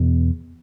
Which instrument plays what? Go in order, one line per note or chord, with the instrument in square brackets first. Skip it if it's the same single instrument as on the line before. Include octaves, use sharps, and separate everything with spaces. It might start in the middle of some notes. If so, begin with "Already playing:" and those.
Already playing: [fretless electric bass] E2 B2